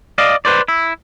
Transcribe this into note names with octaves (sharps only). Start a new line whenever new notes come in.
D5 D#5 F5
B4 C5 D5
E4